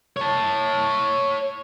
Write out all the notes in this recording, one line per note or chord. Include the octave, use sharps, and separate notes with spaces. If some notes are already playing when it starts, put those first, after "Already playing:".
C#5 A5